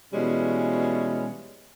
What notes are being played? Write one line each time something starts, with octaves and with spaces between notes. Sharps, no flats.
B2 E3 G3 G#3 C#4